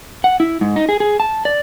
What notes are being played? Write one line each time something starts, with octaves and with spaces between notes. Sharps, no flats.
F#5
E4
G#2
D#4
G#4
G#4
A5
D5